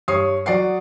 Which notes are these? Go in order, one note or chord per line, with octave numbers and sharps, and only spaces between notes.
G2 C#5 D#6 C7
F#3 D5 F#5 C7